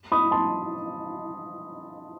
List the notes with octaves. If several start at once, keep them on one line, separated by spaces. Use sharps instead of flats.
B5 D#6
A5 C6